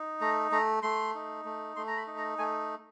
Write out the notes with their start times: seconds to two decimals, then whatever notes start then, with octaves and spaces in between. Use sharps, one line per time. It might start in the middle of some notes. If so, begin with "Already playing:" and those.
Already playing: D#4
0.21 A3 A#5
0.51 A3 A#5
0.83 A3 C6
1.15 D#4
1.45 A3
1.76 A3 C6
1.88 A#5
1.97 B5
2.07 D#4
2.17 A#5
2.38 A3 G#5